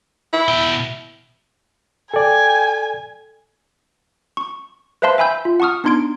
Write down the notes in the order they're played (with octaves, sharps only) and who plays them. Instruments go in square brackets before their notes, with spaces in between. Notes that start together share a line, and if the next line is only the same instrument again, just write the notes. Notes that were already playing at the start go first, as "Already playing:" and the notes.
[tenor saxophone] E4
[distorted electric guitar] B2 G5
[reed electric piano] A4 D5 [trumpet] G5 [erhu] G#5
[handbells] C#6
B4 C5 E5 F5 A5 C6
E5 G5 G#5 B5 E6 G6
F4
F#5 A5 C#6 D#6 F6
B3 D4 D#4 C6 G#6 D7